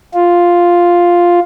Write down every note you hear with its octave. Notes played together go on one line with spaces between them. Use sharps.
F4